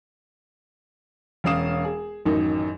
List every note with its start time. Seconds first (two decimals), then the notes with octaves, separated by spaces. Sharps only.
1.44 E1 C#4 C#5 F5 D#6 E7
1.84 G#4
2.25 A1 F#2 D#3 D#4